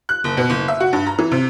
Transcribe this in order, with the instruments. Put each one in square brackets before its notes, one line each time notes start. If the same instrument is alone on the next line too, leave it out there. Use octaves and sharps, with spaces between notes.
[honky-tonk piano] F#6
F#1
B2
F#1
E5
F#4
G2
A#5
E3
C3